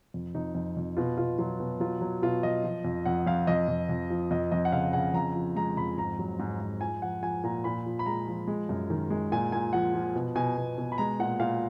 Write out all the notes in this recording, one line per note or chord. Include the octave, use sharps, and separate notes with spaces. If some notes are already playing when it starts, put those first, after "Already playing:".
F2
F2 D#4
F2
F2
B2 F4
B2 F4
F#3 F4
B2
F#3 F4
F#3
B2 F4
F#3 D#5
F3
F2
F2 F#5
F2 F5
F2 D#5
F2
F2
F3
F2 D#5
F2 D#5
F#5
C#3 F5
C#3 F#5
F2 A#5
F3
G#3 A#5
F2 B5
G#2 A#5
F#3
G#2
G#2
F3 G#5
F3 F#5
F3 G#5
A#2 A#5
A#2 B5
F3
B5
G#3 A#5
F3
G#3
F#2
D#3
G#3
A#2 G#5
A#2 G#5
F3 F#5
F3
B2
B2 G#5
B2
B2
B5
G#3 A#5
A#2 F#5
A#2 F5